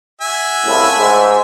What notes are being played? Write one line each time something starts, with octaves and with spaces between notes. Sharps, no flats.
F#4 E5 G#5
C2 A2 C#3
G#2